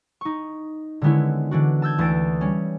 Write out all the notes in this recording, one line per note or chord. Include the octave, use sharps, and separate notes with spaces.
D#4 C#6
D3 D#3 G#3 B3 C#4 E4
D3 E3 D4 F#4
A5 E6 G6 G#6
D2 E3 D#6 A6 D7
G3 C#4